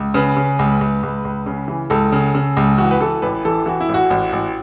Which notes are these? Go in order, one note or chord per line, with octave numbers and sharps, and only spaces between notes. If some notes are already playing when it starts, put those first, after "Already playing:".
Already playing: C#2
C#3 B4
C#3
C#2
C#2
C#2
C#2
C#3
E3
C#2 A4
C#3
C#3
C#2
E3 F#4
B4
E3 A4
A1 B4
E3 A4
E3 F#4
E4
A1
F#4
A1
A1